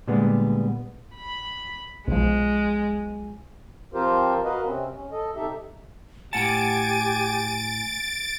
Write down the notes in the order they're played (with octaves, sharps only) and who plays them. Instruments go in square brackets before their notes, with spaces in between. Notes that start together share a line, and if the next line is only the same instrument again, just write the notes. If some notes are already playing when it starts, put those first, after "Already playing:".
[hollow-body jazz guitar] A#2 D3 G3 G#3 B3
[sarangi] B5
[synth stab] B1 F3 [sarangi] G#3
[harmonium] F3 C4 F4 G4 A#4 C5
F#4 A#4 B4 D#5 F5
C3 C4 C#4
C#4
A4 D#5
C3 D#4 G4 A4 E5
[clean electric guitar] A2 F#5 A5 [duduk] G4 [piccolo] G#5 [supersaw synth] A6 D7